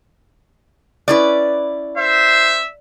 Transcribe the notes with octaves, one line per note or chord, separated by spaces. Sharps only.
C#4 E4 B4 D5
C5 E5